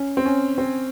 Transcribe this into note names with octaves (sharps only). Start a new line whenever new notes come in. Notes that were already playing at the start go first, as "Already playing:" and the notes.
Already playing: C#4
C4
C#4
C4